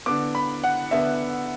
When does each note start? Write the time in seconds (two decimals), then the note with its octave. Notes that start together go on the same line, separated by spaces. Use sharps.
0.06 D3 B3 D6
0.35 B5
0.64 F#5
0.91 D3 B3 E5